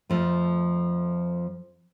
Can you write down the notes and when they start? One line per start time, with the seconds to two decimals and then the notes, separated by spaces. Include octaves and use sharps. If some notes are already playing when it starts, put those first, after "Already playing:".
0.10 F2 F3 A3